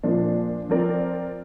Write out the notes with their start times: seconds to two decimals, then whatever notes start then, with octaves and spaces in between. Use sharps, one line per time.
0.03 A#2 F3 D4
0.69 F3 C4 A#4 D5